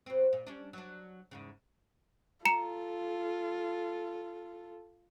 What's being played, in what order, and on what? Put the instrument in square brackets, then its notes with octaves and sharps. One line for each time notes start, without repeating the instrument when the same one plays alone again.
[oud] B2 C4
A#2
G3 C#4 D4
F#3 D4
E2 G#2 C#3
[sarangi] F4 [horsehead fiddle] A4 [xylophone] A#5 C#7 E7